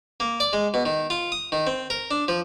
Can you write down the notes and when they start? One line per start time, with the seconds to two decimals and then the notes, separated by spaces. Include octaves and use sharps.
0.20 A#3
0.40 D5
0.53 G#3
0.74 B2
0.86 D#3
1.10 F4
1.32 D#6
1.52 D#3
1.67 C4
1.90 A#4
2.11 D4
2.28 F3